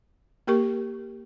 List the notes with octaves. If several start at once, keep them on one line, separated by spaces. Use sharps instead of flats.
A#3 G4 A#4 C#6